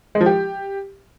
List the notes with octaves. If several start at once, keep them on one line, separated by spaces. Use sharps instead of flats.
G#3
F3
G4